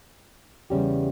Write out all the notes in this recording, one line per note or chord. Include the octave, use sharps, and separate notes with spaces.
E2 C#3 G3 C#4 G4